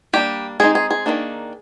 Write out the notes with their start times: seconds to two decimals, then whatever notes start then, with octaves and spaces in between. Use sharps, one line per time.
0.13 G3 A#3 D4 G4
0.60 G#3 C4 D#4 G#4
0.75 G#4
0.91 G#4
1.06 D#3 G3 A#3 D4